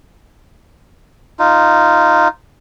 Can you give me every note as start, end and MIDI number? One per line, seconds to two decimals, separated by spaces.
1.39 2.28 63
1.39 2.28 65